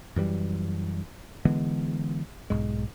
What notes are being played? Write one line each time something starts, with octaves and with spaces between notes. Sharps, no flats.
F#2 E3 G3
D3 E3 G#3 B3
B1 G#2 G#3